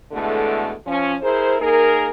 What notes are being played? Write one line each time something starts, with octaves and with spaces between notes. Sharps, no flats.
B2 D3 E3 G#3 A3
F3 C#4
E4 G#4 A#4 C5
A#3 D#4 G#4 A#4